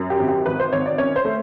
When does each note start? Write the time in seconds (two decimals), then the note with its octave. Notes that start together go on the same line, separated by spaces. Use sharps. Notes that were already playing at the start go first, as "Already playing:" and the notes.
Already playing: F#2
0.10 G4
0.20 G#1
0.29 G4
0.46 G#1 B4
0.60 C5
0.73 G#1 C#5
0.86 D5
0.98 C#4 C#5
1.16 C5
1.25 A3